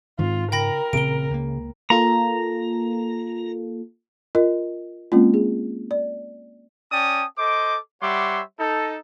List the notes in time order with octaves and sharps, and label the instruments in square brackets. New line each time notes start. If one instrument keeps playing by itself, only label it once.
[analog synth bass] G#2 [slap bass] D#3 G#3 C4 [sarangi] F4
[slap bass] C#3 [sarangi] A#4 [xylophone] G5 B5 A#6
[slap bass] A1 A#2 C4 [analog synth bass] C#3 [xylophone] D7 G7
[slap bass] C#2 A#3
[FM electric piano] A#3 F4 A4 [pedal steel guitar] A#5
[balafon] F4 A#4 D#5
G#3 A#3 C4 C#4 F4
G#4
D5
[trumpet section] C#4 D5 G5 A5 D#6
A4 C5 D#5 D6
G3 C#5 E5 F#5 C6 D6
D#4 A4